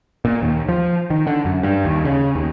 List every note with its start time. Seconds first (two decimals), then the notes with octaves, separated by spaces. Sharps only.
0.25 A#2
0.42 D#2
0.69 F3
1.10 D#3
1.27 D3
1.45 F#2
1.63 G2
1.85 D#2
2.05 C#3
2.35 D#2